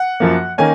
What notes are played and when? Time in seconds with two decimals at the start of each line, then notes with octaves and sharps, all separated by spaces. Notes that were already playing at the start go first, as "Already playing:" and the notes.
Already playing: F#5
0.20 F#2 F3 A#3
0.58 D#3 A#3 C#4 G#5